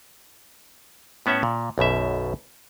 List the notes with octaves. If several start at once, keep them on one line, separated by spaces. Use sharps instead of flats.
A2 B3 C#4 E5 F#5
A#2
B1 F#2 B2 E5